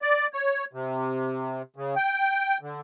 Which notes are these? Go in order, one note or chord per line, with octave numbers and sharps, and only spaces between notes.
D5
C#5
C3
C#3
G5
D3